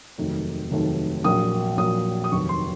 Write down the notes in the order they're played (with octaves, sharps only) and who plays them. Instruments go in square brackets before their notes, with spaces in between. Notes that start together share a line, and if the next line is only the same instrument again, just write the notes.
[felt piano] F1 D#2 D#3 F#3 A3
F1 D#2 D#3 F#3 A3
A#1 A#2 F#3 D#6
A#1 A#2 F#3 D#6
D#6
F1 D#2 D#3 F#3 C#6
C6